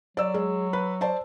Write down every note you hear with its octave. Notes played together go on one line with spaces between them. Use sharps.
F#3 D5 E6
G#3
B4
C5 D5 A5